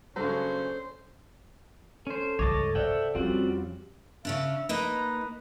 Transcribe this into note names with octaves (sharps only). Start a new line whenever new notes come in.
G2 C#3 F#3 A#3 C#4 A4 C5 D5
C#4 A4 C5
C#2 G2 C#5 D#5 A5 D6 A6
C3 C5 D5 E5 F#5 G5
F2 G3 C4 C#4 F4 F#4
C#3 C#4 D4 E5
A#3 D#4 B4 D#5